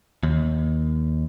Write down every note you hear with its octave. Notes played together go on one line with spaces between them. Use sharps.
D#2